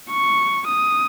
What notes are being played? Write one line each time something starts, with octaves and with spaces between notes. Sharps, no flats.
C#6
D#6